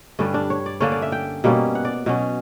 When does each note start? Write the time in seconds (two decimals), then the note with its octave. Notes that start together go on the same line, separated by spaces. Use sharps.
0.19 G2 D3 G3 C#4
0.34 D4
0.50 C#5
0.66 D5
0.80 D3 A#3 C#4 C#5
0.92 D5
1.02 E5
1.12 G5
1.44 B2 G3 A#3 C#4
1.75 F#5
1.85 D5
2.06 B2 F#3 C#4